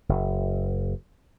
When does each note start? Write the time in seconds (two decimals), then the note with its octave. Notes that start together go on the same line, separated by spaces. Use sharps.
0.09 F#1